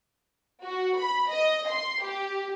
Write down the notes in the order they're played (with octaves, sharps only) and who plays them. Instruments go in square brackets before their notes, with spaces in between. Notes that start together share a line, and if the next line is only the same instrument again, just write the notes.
[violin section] F#4
B5
D#5
C6
G4